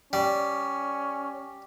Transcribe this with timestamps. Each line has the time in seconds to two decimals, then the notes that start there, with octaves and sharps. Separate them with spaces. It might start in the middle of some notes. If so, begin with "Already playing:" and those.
0.13 G3 C#4